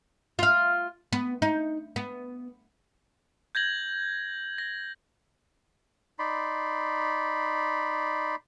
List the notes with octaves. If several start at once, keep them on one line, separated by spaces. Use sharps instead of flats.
F4 F5
B3
D#4
B3
G6 G#6 A#6 F#7
A#6
D#4 D5 B5 C6